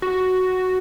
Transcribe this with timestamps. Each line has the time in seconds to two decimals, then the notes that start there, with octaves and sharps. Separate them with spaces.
0.02 F#4